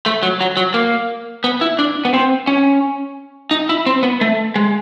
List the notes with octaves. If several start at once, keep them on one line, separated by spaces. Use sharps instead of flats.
A3
F#3
F#3
F#3
A#3
B3
E4
D4
B3
C4
C#4
D#4
E4
C4
B3
A3
G#3